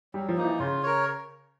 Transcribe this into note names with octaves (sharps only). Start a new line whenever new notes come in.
F#3 G3
F3
A#3 D#4
E3
C#3 F4
A#4 C#5